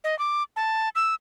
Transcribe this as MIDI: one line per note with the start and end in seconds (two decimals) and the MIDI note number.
0.04 0.18 75
0.19 0.43 86
0.56 0.89 81
0.96 1.14 88